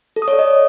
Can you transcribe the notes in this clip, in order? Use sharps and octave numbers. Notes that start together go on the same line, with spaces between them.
A4
D#6
C#5
D5
D#5